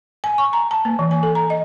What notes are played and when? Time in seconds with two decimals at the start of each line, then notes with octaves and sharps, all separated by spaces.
0.24 G#5
0.38 C#6
0.53 A#5
0.71 A5
0.85 A#3
0.99 E3
1.11 G#5
1.23 A4
1.35 A#5
1.50 D#5